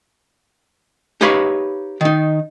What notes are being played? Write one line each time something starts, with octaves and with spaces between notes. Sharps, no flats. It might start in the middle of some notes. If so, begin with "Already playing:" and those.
D#4 G4 B4 C#5 F5 B5
D#3 D#4